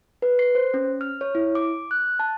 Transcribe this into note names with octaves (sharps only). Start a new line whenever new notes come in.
B4
C7
C5
C#4
F6
C#5
E4
D6
F#6
A5